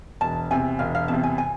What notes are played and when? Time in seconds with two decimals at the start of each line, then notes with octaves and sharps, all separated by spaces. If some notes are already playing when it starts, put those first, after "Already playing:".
0.21 E1 A5
0.50 E2 C3 G#5
0.79 E1 F5
0.95 F5
1.08 E2 C3 A5
1.24 G#5
1.38 G#5